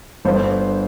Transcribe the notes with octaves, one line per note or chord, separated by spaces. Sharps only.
G1 C5